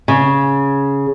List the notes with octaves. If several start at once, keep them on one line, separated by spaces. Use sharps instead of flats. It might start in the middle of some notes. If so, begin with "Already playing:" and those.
C#3